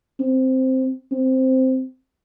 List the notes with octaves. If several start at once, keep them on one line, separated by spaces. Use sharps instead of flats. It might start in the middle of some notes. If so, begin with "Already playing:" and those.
C4
C4